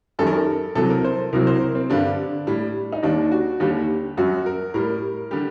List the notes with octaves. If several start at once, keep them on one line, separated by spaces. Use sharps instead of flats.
F#2 D#3 G3 A4
A#4
A4
C2 C3 F#3 A4
A#4
C5
C2 C3 F#3 A#4
C5
A#4
C4
G2 D3 G3 D4
A2 G3
D#4
D#2 D#3 G3 D4
F#4
D#2 D3 G3 G4
F#2 F#3 F#4
A#4
A2 G3 A#4
D3 G3 G4